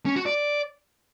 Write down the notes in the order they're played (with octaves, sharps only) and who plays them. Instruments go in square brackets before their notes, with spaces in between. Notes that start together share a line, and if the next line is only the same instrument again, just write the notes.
[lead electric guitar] C#4
F#4
D5